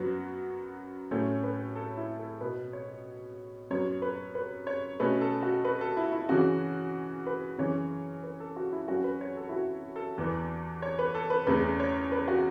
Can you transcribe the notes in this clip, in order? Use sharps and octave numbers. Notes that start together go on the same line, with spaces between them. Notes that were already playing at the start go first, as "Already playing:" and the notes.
Already playing: F#2 F#3 B3 F#4
A2 F#3 A3 C#4 C#5
B4
A4
E4
A4
B2 B3 B4
C#5
F#2 F#3 B3 C#5
B4
B4
C#5
B2 A3 C#4 B4
A4
F#4
B4
A4
E4
E4
C#3 E3 C#4 F#4
B4
F#2 C#3 E3 C#4 C#5
B4
A4
F#4
E4
F#2 F#3 C#4 F#4
B4
C#5
A4
E4
F#4
A4
E2 E3 B3
C#5
B4
A4
B4
E2 C#3 A3 C#4 B4
C#5
B4
F#4